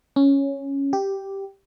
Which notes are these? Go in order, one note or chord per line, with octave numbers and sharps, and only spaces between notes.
C#4
G4